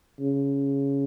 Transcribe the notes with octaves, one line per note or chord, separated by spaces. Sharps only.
C#3